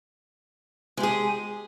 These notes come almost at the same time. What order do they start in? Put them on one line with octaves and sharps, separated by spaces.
G#3 G4 G#4